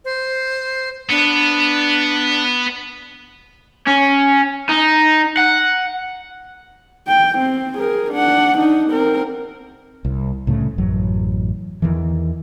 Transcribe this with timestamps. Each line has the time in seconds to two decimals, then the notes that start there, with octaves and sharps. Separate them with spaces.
0.05 C5
1.11 B3 D4
3.87 C#4
4.69 D#4
5.37 F#5
7.08 G5
7.38 C4
7.78 G#4 A#4
8.12 D4 F#5
8.58 D4 D#4
8.90 C4 A#4
10.05 C2
10.47 C2 A2 C#3 A3
10.78 A1 F#2 F#3
11.82 E2 C3 D#3 E3